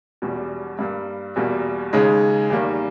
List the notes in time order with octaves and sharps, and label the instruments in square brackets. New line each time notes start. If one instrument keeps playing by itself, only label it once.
[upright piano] E1 E2 B2 G3
G2 G3 A#3
E2 B2 G3 A#3
D#2 C#3 G#3 D#4 G#4
E2 D#3 G3 A#3